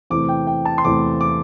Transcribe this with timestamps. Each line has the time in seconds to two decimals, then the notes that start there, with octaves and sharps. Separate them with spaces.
0.10 E2 C3 E3 A3 D6
0.29 G5
0.47 G5
0.65 A5
0.78 C6
0.84 E2 C3 E3 A3 D6
1.21 D6